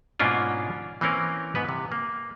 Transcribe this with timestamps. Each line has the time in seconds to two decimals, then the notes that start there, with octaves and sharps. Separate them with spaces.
0.20 G#2 B2 A#3 C#4 D4 F4
1.01 E3 A#3 C4 C#4 A#4
1.55 G#2 B3 B4
1.69 C3
1.92 A#3